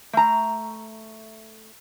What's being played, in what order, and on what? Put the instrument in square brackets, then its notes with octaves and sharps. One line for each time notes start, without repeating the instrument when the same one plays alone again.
[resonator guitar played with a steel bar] A3 A#5